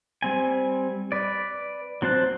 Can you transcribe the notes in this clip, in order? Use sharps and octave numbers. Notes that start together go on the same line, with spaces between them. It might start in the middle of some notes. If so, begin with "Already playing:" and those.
G3 C4 G#5
B4 D5
F#3 C4 C5 A5 F#6